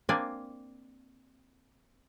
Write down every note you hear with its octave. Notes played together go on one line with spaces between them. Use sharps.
A#3 C4 D4 D5 G#5